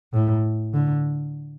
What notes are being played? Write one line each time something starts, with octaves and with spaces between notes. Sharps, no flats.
A2
D3